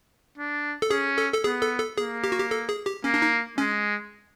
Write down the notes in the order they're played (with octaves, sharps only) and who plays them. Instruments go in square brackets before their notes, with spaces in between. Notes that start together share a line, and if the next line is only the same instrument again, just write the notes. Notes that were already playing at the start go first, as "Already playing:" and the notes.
[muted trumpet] D4
[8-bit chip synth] A4
[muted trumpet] C#4 [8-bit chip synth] G#4
[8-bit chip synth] A4
A4
[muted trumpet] B3 [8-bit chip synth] G#4
[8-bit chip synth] A4
A4
[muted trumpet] A#3 [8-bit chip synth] G#4
[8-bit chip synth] G4
F#4
G4
A4
G#4
G4
[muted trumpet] A#3 [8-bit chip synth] C#4
[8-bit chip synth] D4
D#4
[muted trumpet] G#3 [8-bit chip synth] C#4